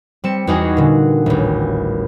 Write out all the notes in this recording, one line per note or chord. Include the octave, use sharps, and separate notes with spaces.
G3 C4 C#7 E7
E2 G3 D#4 F#4 G#4 C#6
A#2 D3
D#1 A1